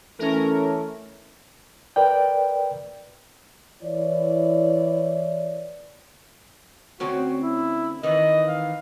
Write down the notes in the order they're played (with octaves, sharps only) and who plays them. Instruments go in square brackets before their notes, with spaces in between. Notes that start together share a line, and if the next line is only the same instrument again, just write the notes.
[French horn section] E3 A3 [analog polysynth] C#4 A#4
[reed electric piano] A#4 B4 D5 G5
[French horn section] E3 E4 C#5 D5
[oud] D2 C4 C#4 [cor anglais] F#4
[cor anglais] E4
[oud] D#3 E3 [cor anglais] D#5
[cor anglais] F5